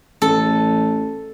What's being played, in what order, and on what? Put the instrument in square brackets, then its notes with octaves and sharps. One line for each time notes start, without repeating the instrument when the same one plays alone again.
[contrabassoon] A1 [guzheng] A4